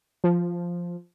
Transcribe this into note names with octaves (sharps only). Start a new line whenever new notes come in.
F3